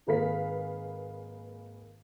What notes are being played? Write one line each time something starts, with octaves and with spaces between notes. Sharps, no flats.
G#1 A#3 G#4 B4 F5 B6